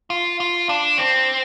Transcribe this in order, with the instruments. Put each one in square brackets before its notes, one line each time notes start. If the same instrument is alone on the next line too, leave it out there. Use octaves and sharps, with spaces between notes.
[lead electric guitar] F4
F4
D4
C4